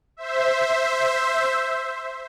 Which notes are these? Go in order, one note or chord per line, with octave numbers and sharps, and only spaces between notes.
C5 E5